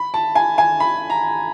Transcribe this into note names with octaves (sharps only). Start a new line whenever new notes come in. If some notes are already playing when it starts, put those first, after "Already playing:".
Already playing: B5
A5
G#5
G#5
B5
A#5